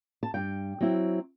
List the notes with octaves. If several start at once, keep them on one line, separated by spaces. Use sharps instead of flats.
A5
G2 G5
F#3 C4 E4